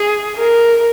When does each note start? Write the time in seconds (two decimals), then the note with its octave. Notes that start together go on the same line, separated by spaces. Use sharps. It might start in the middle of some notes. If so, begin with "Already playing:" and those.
Already playing: G#4
0.38 A#4